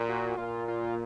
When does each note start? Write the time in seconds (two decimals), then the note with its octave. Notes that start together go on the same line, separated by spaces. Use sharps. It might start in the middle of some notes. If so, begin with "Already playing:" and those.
Already playing: A#2
0.09 F#4
0.37 A#2 F4
0.68 F4